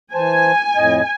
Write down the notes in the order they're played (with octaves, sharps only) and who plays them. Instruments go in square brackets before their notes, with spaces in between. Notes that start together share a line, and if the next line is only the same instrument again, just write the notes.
[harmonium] E3 C5 A5 [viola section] G#5
[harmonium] F2 A2 D#5